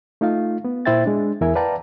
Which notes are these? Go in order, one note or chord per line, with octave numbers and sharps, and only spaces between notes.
A3 D#4 F4 F5
B3
A#2 E4 C5 E5 G5 A6
G#3 D4
E2 E4 A#4 E5 G#5
B4 D5 F5 G5 A5 A#5